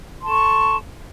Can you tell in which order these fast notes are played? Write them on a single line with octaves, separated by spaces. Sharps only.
C6 A5 A4 C#6